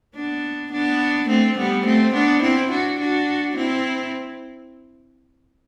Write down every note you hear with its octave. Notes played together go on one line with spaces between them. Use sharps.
B3 D4
B3 D4
A3 C4
G3 B3
A3 C4
B3 D4
C4 E4
D4 F#4
D4 F#4
C4 E4